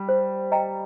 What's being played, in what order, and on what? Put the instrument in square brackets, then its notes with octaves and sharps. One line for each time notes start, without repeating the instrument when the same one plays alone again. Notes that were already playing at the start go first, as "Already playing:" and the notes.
Already playing: [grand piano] G3
[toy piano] C5
D#5 G5 A#5